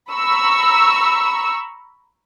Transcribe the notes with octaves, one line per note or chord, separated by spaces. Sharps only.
A#5 B5 C#6 E6